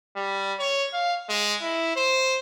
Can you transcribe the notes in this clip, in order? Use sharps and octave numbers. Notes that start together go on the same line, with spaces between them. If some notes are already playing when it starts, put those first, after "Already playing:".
G3
C#5
F5
G#3
E4
C5